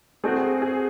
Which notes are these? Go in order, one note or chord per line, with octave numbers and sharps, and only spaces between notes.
A3 C4 F#4 G#4
G#4